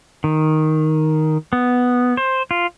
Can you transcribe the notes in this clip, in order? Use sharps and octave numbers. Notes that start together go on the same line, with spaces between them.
D#3
B3
C5
F4